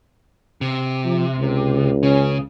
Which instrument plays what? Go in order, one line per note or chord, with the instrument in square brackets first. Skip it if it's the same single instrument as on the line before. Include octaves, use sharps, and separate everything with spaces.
[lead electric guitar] C3
[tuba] F3
C#2
[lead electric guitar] C#3 [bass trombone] C#4